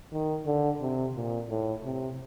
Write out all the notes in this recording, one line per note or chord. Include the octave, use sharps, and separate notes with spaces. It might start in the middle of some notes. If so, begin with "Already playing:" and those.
D#3
D3
C3
A#2
A2
C3